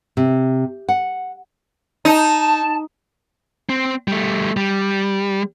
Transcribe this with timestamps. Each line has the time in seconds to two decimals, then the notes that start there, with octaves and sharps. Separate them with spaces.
0.17 C3
0.89 F#5
2.05 D#4 A5
3.69 C4
4.08 G3 A3
4.57 G3